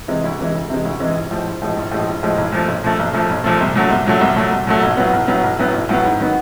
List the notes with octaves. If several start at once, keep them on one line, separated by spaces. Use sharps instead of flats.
C3 E3 G#3
D2
C3 E3 G#3
D2
C3 E3 G#3
D2
C3 E3 G#3
A#1
A2 F3 G#3
A#1
A2 F3 G#3
A#1
A2 F3 G#3
A#1
A2 F3 G#3
B1
A#2 F3 A3
B1
A#2 F3 A3
B1
A#2 F3 A3
B1
A#2 F3 A3
C2
A#2 F#3 A3
C2
A#2 F#3 A3
C2
A#2 F#3 A3
C2
A#2 F#3 A3
B1
A2 F#3 B3
B1
A2 F#3 B3
B1
A2 F#3 B3
B1
A2 F#3 B3
G#2
D#3 F#3 B3